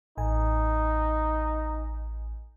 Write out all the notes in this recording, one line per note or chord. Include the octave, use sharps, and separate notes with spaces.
A1 D#4 G#5